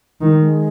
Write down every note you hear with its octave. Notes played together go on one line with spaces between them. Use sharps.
D#3 G#3
G#3